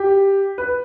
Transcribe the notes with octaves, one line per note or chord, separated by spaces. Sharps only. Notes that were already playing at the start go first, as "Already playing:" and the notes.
Already playing: G4
B4